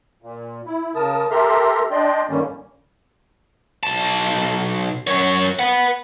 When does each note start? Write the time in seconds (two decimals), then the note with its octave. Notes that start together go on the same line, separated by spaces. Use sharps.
0.22 A#2
0.66 E4
0.95 C#3 A#4 A5 D#6
1.31 G4 A4 A#4 E5 A#5 C6
1.91 D4 D5 D#5 G5 C6
2.29 G2 D3 D#3 G3 A#3 C#4
3.83 B1 A5
5.07 F#2 C#5
5.59 B4 F#5